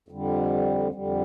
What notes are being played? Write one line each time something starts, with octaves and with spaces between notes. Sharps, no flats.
F2 D3 G3
F2 D3 G3